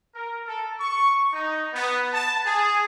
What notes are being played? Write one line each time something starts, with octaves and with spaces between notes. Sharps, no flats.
A#4
A4
C#6
D#4
B3
A5
G#4